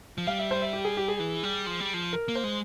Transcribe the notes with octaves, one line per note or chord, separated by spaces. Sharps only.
F3
G3 F5
E5
C5
E5
G4
G#4
G4
G#4
E3
G3
F3
G3
F3
A#4
A#3
C5
G#3